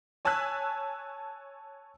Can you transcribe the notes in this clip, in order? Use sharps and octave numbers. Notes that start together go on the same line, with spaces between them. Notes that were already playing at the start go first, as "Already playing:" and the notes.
C#5 G#5 A5 E6 F#6 B6